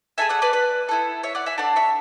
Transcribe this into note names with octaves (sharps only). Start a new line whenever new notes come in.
A3 D4 G#4 E5 G#5
D5 F#5
B4 D5
B4 D5
B3 E4 A4
C#5 E5
D5 F#5
E5 G#5
D4 A4 D5 F#5
C#5 E5